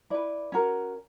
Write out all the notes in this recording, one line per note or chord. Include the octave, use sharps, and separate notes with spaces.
E4 B4 D5
C#4 F#4 A#4